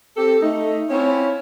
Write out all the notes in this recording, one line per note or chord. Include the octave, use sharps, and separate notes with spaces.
C4 G4 A4
A3 D#4
C4 C#4 E4 F4 C#5